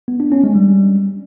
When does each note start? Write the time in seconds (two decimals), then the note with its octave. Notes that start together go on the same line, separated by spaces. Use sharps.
0.08 B3
0.20 D4
0.32 C#4
0.44 G#3
0.56 G3